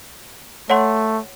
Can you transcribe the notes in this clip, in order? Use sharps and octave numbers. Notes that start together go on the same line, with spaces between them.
A3 C#5 F#5 C6